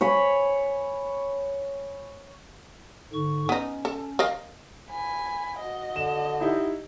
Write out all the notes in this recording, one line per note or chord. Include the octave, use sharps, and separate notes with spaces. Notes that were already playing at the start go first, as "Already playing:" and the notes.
C#5 G#5 B5
G#2 D3 C#6
B3 C#4 D#4
A4
A#4 D#5 F5
G#5 B5
F#4 D#5
D3 E7
D#4 E4 G4